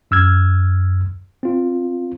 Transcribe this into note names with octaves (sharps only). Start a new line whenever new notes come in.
F#2 E6 F6 G#6
C4 F4